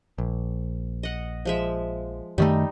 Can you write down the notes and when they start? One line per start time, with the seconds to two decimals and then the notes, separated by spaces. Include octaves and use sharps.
0.18 A#1
1.03 D#5 F#5
1.45 F3 G#3 E5
2.38 F#2 D#3 G3 A3 D#4